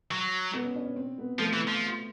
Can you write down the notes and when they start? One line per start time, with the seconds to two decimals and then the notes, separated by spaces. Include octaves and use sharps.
0.11 F#3
0.53 B3
0.64 C#4
0.75 D4
0.85 C#4
0.96 C4
1.18 B3
1.39 F3 A3
1.53 E3
1.68 F3